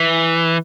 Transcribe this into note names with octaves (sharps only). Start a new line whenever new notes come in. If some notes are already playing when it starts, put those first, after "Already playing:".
Already playing: E3